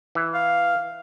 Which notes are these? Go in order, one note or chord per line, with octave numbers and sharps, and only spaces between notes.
E3
F5